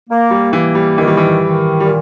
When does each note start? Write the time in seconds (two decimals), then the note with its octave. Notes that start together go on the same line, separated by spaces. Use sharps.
0.09 A#3
0.31 G3
0.53 E3 A#3
0.75 G3
0.98 D#3 E3
1.08 G3
1.17 E3
1.42 D#3
1.80 G3
1.86 A#2